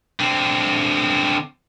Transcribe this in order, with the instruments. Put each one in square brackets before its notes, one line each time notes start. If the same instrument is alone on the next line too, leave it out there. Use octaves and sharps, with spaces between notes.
[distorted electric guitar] D3 C4